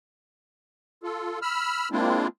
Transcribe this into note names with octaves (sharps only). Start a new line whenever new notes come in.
F4 A4
B5 E6 F6
G#3 A#3 C4 D4 E4 F4